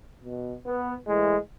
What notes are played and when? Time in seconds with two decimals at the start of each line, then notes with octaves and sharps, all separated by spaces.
0.24 B2
0.66 B3
1.07 A2 E3 G#3